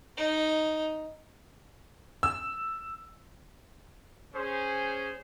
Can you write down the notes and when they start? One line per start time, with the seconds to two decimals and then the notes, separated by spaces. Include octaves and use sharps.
0.17 D#4
2.23 E6
4.34 C#4 G#4 C5